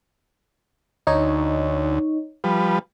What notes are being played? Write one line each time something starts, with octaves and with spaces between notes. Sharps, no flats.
D2 D#4 C#5
F3 G3 B4